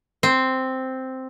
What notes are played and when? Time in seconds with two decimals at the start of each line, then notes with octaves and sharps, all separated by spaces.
0.23 C4